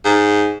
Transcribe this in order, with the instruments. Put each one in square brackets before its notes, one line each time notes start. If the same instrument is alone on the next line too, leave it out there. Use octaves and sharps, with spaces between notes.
[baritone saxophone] G#2